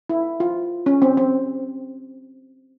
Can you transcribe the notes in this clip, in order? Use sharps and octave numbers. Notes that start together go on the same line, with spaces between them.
E4
F4
C#4
C4
C4